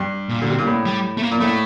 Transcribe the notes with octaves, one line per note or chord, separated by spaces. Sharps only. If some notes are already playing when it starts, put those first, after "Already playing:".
Already playing: G2
A#2
D3
C3
A#2
A2
G3
A3
A#3
A#2
A2 A3